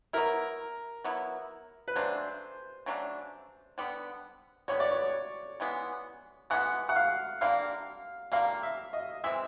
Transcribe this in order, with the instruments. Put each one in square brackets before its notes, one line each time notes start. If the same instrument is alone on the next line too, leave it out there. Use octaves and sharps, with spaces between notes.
[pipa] F#3 B3 E4 [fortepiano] A#4
[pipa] F#3 B3 E4
[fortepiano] B4
[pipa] C#3 F#3 A3 D4 [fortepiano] C5
[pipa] C#3 F#3 A3 D4
D3 G3 B3
[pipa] D3 G3 B3 [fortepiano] C#5
[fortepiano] D5
C#5
[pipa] C#3 E3 G#3 B3
[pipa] C#3 E3 G#3 B3 [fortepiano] F#5
[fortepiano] F#5
F5
[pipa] D3 G3 A#3 [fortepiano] F5
[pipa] D3 G3 A#3 [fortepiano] F5
[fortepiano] E5
D#5
[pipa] E3 G#3 C4 [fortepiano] E5